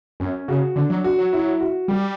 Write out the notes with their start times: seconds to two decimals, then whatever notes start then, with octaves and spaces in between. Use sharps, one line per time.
0.20 F#2 C#4
0.48 C#3 F#4
0.76 D3 D4
0.90 F#3
1.04 F#4
1.18 F#3
1.33 F#3 E4
1.61 F#4
1.88 G3 G4